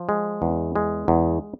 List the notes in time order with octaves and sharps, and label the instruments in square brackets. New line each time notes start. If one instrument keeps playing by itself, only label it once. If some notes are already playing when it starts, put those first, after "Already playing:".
Already playing: [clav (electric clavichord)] F3
G#3
E2
G#3
E2